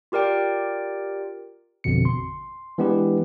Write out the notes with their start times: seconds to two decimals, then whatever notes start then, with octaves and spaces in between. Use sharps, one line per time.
0.12 F4 G4 A#4 D5 G5
1.84 A1 F2 B2 D3 C#7
2.05 C6
2.78 E3 G#3 B3 D4 G4 B4